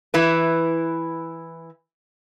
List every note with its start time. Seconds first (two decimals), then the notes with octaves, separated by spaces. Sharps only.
0.14 E3 E4 B4